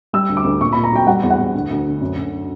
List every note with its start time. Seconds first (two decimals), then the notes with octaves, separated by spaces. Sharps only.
0.13 G3 E6
0.29 D2
0.37 D6
0.44 D2
0.61 A#2 C#6
0.73 A#2 B5
0.84 A#5
0.92 F#3 G5
1.07 G3 F#5
1.23 E2
1.30 F#5
1.38 E2
1.54 D2
1.70 D2
1.86 D3
2.01 F#2
2.16 F#2